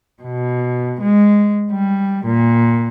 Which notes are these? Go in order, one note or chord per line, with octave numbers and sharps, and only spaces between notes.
B2
G#3
G3
A#2